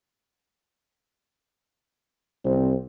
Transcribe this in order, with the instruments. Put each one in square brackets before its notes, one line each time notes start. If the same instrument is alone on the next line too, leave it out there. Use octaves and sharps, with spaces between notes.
[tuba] C2 [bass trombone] C4